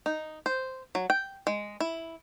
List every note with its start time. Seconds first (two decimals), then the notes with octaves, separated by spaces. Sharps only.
0.06 D#4
0.46 C5
0.95 F#3
1.10 G5
1.47 G#3
1.80 E4